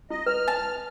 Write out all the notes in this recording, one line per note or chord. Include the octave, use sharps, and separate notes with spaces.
E4 D#5
B4 F6
A5